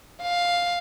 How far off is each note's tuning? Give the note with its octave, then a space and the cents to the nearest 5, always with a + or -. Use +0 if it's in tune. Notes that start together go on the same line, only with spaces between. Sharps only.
F5 +5